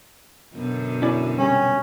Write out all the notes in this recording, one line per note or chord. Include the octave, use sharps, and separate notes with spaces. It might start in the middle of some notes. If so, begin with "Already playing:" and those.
F#2 B2 D3
C#4 E4 D5
C3 G3 C#4